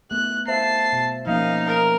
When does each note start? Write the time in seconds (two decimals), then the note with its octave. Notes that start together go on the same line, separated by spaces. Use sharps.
0.11 A3 B3 F#6
0.48 C5 E5 F5 A5 C7
0.93 B2
1.27 F3 A#3 C#4 D#4 F5
1.67 A#4